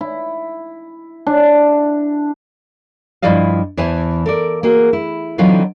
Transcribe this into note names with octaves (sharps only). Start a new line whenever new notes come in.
E4
D4
G2 F3 E4 D5 D#5 F5
E2 E3 C5 E5 G#5 A5
A4 A#4 D5
A#3 F#4 G#4
E4
D3 E3 F#3 C4 D#4 F4